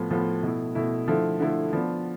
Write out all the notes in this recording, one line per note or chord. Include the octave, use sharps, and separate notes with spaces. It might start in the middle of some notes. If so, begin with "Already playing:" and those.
Already playing: A2 F3 B3
A2 F3 B3
B2 A3 E4
B2 A3 E4
D3 F3 A3 E4
D3 F3 A3 E4
F3 B3 D4